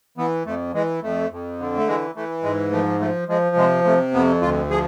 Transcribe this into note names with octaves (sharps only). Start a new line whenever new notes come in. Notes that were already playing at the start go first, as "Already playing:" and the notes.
E3 B3
F2 A3
E3 G#3
F2 A3
F2
D3
A3
E3 G#3
E3 A3
G#2 G#3
F3 A3
F3 A3
F3 G#3
C3 G#3
C3 A3
F2 B3
D2 F4
F3 G#4